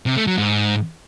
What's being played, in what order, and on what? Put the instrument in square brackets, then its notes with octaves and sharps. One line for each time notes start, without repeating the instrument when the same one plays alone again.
[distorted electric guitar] C3
A3
F#3
G#2